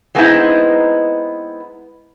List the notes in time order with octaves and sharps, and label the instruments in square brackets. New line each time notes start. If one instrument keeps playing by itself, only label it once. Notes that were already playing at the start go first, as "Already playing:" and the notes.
[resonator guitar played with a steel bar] F#3 G#3 B3 C4 D#4 E4